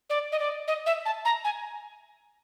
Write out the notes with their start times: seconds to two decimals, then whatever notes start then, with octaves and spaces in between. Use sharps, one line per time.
0.10 D5
0.32 D#5
0.40 D5
0.68 D#5
0.86 E5
1.05 A5
1.25 A#5
1.44 G#5